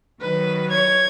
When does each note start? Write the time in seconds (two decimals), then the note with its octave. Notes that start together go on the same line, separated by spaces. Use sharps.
0.21 D#3 F#3 B4
0.72 C#5 G#6